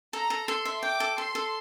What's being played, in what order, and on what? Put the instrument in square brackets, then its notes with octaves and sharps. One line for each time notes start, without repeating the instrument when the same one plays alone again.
[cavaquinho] A4 [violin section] A#5
[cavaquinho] A4
[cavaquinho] A4 [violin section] C6
[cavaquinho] E5
[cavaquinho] G5 [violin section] D6
[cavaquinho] A4
[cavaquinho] A4 [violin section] C6
[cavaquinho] A4